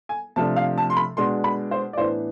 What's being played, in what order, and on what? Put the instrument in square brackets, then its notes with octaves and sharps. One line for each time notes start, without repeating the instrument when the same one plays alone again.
[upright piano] G#5
C3 F3 A3 D4 A5
F5
A5
C6
B5
B2 G#3 D4 C6
B5
C5
D5
A2 E3 B3 D4 C5